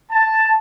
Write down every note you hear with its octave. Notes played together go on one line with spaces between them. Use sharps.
A5